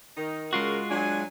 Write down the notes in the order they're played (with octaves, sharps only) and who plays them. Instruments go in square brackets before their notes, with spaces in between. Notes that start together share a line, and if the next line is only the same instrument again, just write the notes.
[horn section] D#3 D#4
[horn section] C#3 A#4 [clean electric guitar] G#3 F4 F#4
[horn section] F#3 D4 G#5